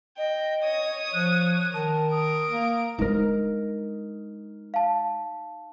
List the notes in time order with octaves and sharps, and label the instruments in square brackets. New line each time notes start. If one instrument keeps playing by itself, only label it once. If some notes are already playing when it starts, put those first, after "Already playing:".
[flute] D#5 [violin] G5
[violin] C#5 D#6
[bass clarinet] F3 [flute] F#6
[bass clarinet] D#3 [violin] A#4 [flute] A5
[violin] A#4 D7 [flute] D#6
[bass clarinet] A#3
[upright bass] G#3 D4 [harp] D#4 A#4
[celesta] F5 A5